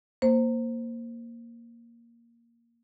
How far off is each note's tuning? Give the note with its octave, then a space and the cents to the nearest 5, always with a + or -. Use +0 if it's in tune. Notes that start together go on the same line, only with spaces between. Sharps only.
A#3 +0 C5 +0